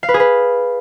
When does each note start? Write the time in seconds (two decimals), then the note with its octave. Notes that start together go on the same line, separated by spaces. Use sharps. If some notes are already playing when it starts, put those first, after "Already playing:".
0.03 F5
0.09 B4
0.14 G#4
0.20 B4